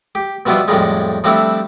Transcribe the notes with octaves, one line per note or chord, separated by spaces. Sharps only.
G4
B2 F3 G3 B3 E4 F4
F2 A2 F3 G3 G#3
F3 G3 A3 C4 D4 E4